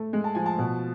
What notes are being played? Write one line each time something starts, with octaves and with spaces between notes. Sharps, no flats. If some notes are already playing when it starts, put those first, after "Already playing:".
Already playing: A3
G#3
A5
F3 G#5
A5
B2